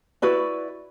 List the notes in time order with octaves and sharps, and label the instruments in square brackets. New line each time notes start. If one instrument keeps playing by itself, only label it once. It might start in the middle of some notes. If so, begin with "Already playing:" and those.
[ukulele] E4 F#4 B4 D5